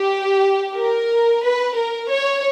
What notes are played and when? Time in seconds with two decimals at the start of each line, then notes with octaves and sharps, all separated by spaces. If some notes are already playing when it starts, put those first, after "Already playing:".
Already playing: G4
0.77 A#4
1.44 B4
1.77 A#4
2.11 C#5